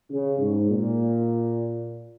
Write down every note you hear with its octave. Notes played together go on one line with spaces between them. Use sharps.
C#3
G#2
A#2